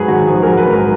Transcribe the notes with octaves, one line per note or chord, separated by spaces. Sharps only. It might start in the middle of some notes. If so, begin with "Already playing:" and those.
Already playing: G#2 F#3 G#4 B4
D#3 F#4
A#1 G#4
F#3 A#4
B4
G#2
A#4